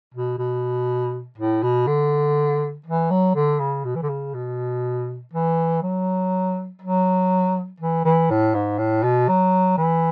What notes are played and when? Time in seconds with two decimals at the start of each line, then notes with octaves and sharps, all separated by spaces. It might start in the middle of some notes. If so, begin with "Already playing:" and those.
0.14 B2
0.38 B2
1.38 A2
1.63 B2
1.87 D3
2.86 E3
3.11 F#3
3.35 D3
3.60 C#3
3.85 B2
3.95 E3
4.03 D3
4.09 C#3
4.34 B2
5.33 E3
5.82 F#3
6.81 F#3
7.80 E3
8.05 E3
8.30 A2
8.54 G#2
8.78 A2
9.03 B2
9.28 F#3
9.78 E3